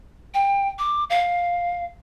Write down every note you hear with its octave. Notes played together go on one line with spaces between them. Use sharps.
G5
D6
F5